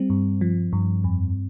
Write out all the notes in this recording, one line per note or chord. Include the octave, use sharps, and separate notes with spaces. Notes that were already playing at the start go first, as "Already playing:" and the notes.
Already playing: G3 C4
G2
F3
G2
F2